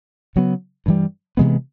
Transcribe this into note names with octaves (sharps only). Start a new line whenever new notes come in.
C#3 F#3 B3
G2 E3 G3
C3 E3 G#3 B3